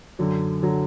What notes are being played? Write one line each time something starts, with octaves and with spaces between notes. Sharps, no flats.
F#2 D3 F#3
D3 F#3